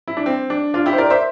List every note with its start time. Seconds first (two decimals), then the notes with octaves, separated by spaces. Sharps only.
0.08 E4
0.17 D4
0.26 C4
0.50 D4
0.74 D4 F4
0.86 E4 G4
0.93 C5
0.98 A#4 D5
1.10 C5 E5